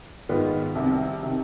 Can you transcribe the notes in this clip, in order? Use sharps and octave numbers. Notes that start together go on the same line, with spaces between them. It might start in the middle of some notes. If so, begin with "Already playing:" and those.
G#2 D#3 B3 F4
C2 C3 D#3
C3 D#3